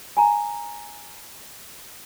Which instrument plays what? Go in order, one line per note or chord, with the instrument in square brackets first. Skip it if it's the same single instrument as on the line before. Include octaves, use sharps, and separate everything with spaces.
[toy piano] G#5 A#5